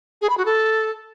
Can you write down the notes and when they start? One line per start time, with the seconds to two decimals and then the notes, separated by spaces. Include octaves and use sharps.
0.22 G#4
0.30 B5
0.37 F#4
0.45 A4